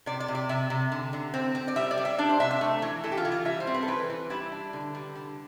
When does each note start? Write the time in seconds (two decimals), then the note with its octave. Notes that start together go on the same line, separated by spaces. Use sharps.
0.06 C3 D5
0.20 D5
0.28 C3
0.35 D5
0.49 C3 E5
0.70 C3
0.92 D3
1.13 D3
1.34 C4
1.55 C4
1.68 D5
1.76 G3 E5
1.91 D5
1.97 G3
2.05 E5
2.18 D4 D5
2.29 C5
2.40 C3 E5
2.51 E5
2.61 A3
2.82 E3
3.04 E3 A4
3.12 G4
3.17 F4
3.25 E3
3.32 F4
3.45 G3 E5
3.60 C5
3.67 C4
3.74 B4
3.83 A4
3.88 E3 B4
4.10 E3
4.30 G3 E4
4.52 D4
4.73 D3
4.95 G3
5.15 D3